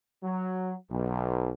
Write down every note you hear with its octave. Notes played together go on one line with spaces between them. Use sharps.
F#3
B1